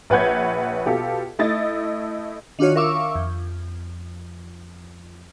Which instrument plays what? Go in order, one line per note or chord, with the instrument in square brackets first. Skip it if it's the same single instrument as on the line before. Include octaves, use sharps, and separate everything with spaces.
[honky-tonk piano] A#1 B4 C#5 F#5 G6 G#6
B2 F4 G4 A4
A3 E4 D#5 A6
[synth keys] D#3 D4 F4 F#4 C#5
A#4 E5 F5 C#6 D6 E6
F2